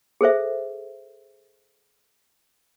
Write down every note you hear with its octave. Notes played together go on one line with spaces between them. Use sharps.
G#4 A4 C5 E5